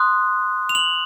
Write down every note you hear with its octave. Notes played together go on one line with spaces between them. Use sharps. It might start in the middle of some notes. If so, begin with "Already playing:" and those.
Already playing: C6 D#6 F#6
F7
F#7